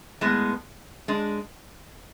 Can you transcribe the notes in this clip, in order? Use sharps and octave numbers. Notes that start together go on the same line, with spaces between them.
A2 G#3 B3
G#3 D4